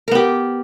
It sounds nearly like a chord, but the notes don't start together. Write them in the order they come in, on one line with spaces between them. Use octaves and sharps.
A#4 B3 G4